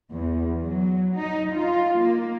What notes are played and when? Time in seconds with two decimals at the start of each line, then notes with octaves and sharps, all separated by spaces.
0.13 E2
0.65 F#3
1.18 D#4
1.56 F4
2.01 A#3